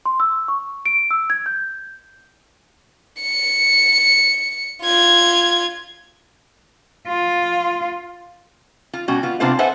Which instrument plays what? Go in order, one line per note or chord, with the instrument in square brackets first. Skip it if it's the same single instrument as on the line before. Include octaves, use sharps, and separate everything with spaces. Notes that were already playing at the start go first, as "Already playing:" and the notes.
[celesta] C6
E6
C#6
D7
E6
G#6
G6
[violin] C#7
F4 G#6
[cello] F4
[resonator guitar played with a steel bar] F4
B2 G3 C#4 F#4
B3 F4
C3 B3 D4 F4 C5 F5
A4 B4 C5 E5 F#5 G#5